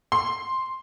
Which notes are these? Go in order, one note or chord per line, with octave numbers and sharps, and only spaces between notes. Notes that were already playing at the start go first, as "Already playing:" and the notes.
C6